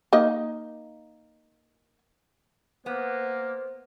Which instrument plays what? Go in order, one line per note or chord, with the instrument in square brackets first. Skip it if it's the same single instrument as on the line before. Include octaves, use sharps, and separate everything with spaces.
[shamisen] A#3 D#4 D#5
[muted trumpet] A#3 [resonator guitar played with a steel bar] B3 [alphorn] C5